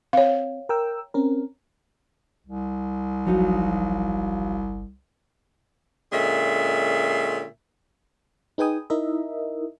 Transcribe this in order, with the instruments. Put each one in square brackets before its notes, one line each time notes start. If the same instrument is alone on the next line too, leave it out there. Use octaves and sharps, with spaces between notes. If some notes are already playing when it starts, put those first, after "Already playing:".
[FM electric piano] C4 [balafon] C#5 F5
[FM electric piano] A#4 G5 E6
C4 C#4 A#4
[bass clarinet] C2
[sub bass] G1 [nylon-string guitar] F3 F#3 D#4
[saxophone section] A#2 D3 G#3 C#4 E5
[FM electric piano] D#4 G#4 B4 G5 G#5 D#6
D#4 E4 A#4 D#5 E5